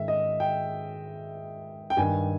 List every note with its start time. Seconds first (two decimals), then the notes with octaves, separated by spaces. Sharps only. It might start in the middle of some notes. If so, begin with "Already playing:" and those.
Already playing: G#2 D#3 E5
0.08 D#5
0.40 G5
1.90 G5
1.97 G2 D#3 G#5